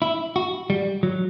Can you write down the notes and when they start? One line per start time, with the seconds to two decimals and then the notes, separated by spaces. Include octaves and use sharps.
0.02 E4
0.36 F#4
0.70 G3
1.03 F#3